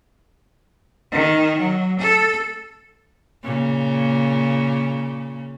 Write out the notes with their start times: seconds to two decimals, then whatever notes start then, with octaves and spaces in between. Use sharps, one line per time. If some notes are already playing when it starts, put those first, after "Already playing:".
1.12 D#3
1.58 F#3
1.98 A4
3.44 A#2 C#3